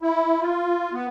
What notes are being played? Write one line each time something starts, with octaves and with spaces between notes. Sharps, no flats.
E4
F4
B3